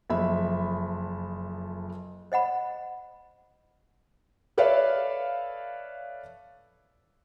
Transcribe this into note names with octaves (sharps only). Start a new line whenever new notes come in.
F#1 F2 E5 B5
C5 D#5 F#5 B5
A4 B4 C#5 D5 E5 F5